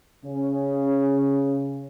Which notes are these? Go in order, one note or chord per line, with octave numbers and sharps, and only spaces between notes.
C#3 C#4